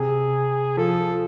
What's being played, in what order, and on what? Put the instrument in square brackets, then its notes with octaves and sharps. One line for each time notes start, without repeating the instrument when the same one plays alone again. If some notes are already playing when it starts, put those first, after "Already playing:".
Already playing: [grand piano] C3 [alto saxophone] G#4
[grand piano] F3 [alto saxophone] A4